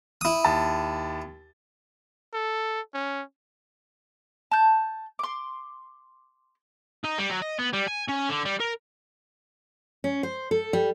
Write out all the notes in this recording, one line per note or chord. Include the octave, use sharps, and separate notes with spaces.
E4 D#6
D#2 A5
A4
C#4
A5 G6
C6 D6
D#4
G3
F#3
D#5
B3
G3
G#5
C#4
D3
G3
A#4
C#4
C5
A4
G3